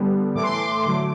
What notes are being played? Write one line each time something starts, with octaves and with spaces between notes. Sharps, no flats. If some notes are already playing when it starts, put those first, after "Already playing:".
Already playing: D3 G3 B3
A2 E3 A3 D6
C6
D6
D3 F#3 A3 D6